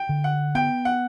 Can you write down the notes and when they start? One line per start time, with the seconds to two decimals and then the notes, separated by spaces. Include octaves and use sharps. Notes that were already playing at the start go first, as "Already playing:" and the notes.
Already playing: G5
0.09 D3
0.24 F#5
0.55 B3 G5
0.85 F#5